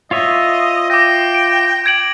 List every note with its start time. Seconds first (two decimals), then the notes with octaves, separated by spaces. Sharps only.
0.11 F4 C#5 D#5 E5
0.90 G5 D6 A#6
1.35 D7
1.86 G#6 D7 F#7